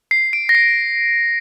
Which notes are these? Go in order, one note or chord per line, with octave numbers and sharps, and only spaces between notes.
C7
D7
A#6
C7